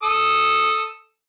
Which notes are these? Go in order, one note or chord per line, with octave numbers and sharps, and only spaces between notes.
A4 D#6 E6